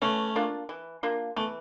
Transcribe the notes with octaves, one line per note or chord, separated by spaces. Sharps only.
E3 A3 C#4
A#3 D4 F4
E3
A#3 D4 F4
E3 A3